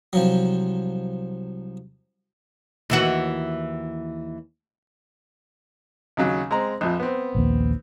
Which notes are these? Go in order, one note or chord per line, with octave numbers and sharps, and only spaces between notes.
C2 F3 F#3
D#2 E3 F#4
D#2 C#3 F#3
G#3 C4 A#5
A#1 F2 F3
B3 C4
A#1 D#2